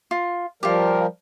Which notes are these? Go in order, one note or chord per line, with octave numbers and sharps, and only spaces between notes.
F4
F3 G3 F4 G4 A#4